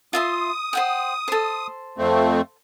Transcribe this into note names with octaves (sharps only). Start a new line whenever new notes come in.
F4 E5 C6 D#6
C5 F#5 G5
A4 C5
F2 A3 C4